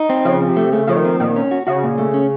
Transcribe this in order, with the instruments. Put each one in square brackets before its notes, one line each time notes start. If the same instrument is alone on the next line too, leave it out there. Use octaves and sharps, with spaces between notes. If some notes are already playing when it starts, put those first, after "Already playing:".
Already playing: [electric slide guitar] D#4
C4
[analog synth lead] C#3 [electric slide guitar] F3
[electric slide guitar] C4
[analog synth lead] C3
[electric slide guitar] A3
[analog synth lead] C#3 [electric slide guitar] A3
[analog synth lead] C#3 [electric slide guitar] F3
[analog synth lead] D#3
[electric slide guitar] C4
[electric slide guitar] A#2 [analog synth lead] D#3
[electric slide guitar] C#4
F#4
[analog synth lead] C#3 [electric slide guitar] F#4
[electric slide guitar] A#2
A3
C#4